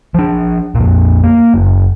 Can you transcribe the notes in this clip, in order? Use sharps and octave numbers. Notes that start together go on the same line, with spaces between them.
F3 D4
F2 A#2
A#3
F#1